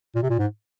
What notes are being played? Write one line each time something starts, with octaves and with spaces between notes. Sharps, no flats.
A#2
C3
A#2
G#2